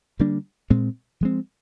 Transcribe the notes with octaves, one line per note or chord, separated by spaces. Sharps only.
D3 G3 A#3 D4
A#2 G#3 C4
F3 G#3 C4